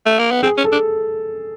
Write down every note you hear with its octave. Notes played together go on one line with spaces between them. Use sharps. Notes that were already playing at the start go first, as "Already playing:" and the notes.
A3
A#3
B3
C4 G#4
C#4
A4
D4